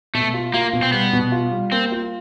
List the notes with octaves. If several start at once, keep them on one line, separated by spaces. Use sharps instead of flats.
B2 A3
F4
A#3 F4
B2
C4
G3 B3
B2
F4
G3
A#3 C4
F4